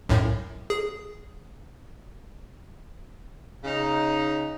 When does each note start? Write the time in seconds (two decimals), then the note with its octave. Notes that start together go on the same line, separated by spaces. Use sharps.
0.09 B1 F#2 A2
0.70 G#4
3.64 C#3 D#4